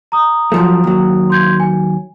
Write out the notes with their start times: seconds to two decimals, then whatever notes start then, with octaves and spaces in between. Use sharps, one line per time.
0.12 A#5 D#6
0.52 F#2 F3 A3
0.84 D#2 F#3
1.30 C6 G6 G#6
1.60 G#5